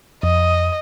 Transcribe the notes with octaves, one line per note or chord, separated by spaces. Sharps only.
F2 D#5